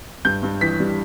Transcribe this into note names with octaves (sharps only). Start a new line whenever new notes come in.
G2 G6
G2
E3 B6
G3